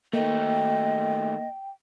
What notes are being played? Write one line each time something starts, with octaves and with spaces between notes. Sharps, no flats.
D#3 A3 A#3 D#5 G5